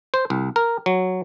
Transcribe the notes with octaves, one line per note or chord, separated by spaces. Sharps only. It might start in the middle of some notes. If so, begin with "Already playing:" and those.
C5
C2
A#4
F#3